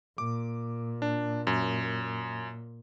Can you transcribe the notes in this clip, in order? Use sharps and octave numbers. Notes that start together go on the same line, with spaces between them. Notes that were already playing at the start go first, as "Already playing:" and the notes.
A#2 D6
D4
F#2